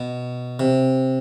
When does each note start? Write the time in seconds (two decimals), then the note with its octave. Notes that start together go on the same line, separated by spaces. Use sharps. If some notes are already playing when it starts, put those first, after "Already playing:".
Already playing: B2
0.59 C3